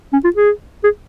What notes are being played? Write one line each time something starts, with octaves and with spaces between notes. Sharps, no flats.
C#4
F4
G#4
G#4